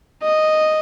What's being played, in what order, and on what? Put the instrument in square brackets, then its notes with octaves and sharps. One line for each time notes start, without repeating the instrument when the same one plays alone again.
[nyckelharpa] D#5